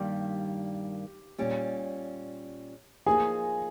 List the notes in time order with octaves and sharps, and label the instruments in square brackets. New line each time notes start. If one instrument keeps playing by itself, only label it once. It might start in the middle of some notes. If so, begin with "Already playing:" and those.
Already playing: [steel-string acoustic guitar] G2 D#3 G3 A#3 [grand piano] G4
[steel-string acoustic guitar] A#2 G3 C#4
[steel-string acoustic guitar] F3 A#3 D#4 [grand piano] G#4 G#5